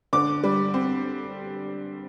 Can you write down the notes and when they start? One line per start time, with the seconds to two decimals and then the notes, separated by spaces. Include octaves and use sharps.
0.13 D3 D6
0.43 G3
0.74 C4